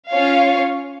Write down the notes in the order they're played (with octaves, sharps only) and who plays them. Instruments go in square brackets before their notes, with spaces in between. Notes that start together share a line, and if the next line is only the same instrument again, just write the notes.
[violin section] C#4 F4 C#5 F5